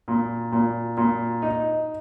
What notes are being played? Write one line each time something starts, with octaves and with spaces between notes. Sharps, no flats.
A#2
A#2
A#2
D#4